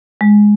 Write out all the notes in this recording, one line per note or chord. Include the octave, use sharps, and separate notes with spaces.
G#3